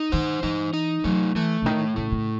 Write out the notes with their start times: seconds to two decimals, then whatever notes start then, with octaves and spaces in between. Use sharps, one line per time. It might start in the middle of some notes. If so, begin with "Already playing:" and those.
Already playing: D#4
0.12 D#3 C5
0.43 E3 D#4
0.73 D#4
1.04 F#3 A3
1.35 E3 A3
1.62 C#3
1.66 A2 D#3
1.96 C#3 A3
2.12 C#3